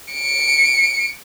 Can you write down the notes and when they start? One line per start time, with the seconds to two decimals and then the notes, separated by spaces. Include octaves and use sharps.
0.12 C#7 D7